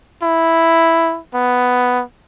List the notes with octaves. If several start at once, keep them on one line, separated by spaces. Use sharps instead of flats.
E4
B3